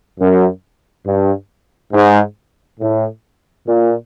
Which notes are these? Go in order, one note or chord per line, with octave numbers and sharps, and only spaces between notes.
F#2
G2
G#2
A2
A#2